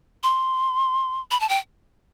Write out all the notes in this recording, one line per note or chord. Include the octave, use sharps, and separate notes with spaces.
C6
B5
A5
G5